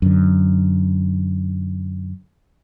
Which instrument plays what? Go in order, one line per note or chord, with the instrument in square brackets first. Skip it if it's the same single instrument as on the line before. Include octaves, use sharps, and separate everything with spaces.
[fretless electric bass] F#2 D3